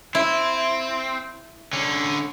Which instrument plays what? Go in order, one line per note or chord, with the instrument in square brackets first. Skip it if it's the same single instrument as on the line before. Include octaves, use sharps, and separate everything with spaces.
[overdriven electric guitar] C4 [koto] E4
[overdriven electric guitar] D3 C#4